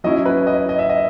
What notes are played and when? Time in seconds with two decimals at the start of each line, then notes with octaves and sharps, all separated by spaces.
0.04 F#3 C#4 E4 D#5
0.26 B4
0.47 D#5
0.69 D#5
0.79 E5
0.90 D#5